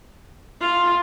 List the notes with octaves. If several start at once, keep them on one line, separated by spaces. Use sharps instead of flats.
F4